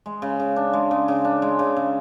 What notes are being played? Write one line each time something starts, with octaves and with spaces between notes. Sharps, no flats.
G#3
C#3
C#3
D4
G#3
C#3
C#3
D4
G#3
C#3
C#3